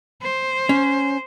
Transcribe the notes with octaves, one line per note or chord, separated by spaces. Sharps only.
C5
C#4